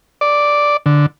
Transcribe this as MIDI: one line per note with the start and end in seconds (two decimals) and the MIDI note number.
0.21 0.77 74
0.86 1.06 50